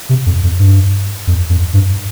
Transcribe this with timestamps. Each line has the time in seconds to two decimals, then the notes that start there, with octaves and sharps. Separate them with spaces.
0.09 C3
0.26 F2
0.43 F2
0.59 G2
1.27 F2
1.50 F2
1.73 G2